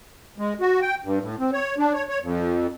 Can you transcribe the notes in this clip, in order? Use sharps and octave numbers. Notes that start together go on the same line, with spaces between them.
G#3
F#4
G5
G2
A2
C4
C#5
D4
C#5
C#5
F2